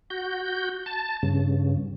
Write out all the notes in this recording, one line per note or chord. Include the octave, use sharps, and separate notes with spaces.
F#4 G6
A5
G2 C#3